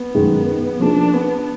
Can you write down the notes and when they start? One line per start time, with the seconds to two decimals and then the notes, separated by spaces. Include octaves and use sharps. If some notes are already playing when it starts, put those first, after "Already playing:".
Already playing: B3
0.15 F#2 D#3 G#3 D#4 G#4
0.80 F3 A#3 D4 D#4 G#4
1.14 B3